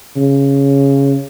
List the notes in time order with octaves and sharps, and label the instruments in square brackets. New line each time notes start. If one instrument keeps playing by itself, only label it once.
[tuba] C#3